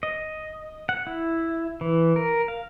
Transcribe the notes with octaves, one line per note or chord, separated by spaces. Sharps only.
D#5
F#5
E4
E3
A#4
F5